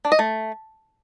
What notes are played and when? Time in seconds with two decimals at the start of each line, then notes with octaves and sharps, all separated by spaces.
0.05 D4
0.12 D#5
0.19 A3